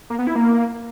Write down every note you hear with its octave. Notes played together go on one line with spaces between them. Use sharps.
A#3
B3
E4
A#3